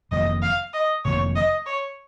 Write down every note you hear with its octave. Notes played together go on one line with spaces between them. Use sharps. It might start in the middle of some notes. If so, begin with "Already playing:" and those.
F1 F2 D#3 A#3 D#5
F5
D#5
F1 F2 D#3 A#3 C#5
D#5
C#5